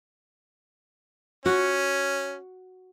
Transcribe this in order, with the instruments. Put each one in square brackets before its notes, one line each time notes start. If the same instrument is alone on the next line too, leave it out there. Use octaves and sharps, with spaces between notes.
[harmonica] C#4 [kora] F#4